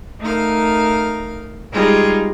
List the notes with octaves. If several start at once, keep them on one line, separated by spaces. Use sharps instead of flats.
A3 D#4 A#4 F5
G3 G#3 D#4 F4 G4 G#4